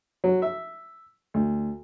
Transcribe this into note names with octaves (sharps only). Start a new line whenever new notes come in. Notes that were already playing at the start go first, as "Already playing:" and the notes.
F#3
E5
D2